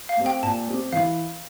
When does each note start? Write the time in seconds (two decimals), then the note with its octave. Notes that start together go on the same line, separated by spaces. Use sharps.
0.09 F5
0.17 A3 C4 G4
0.26 G5
0.43 A#2 A5
0.67 A3 C4 G4
0.93 E3 F5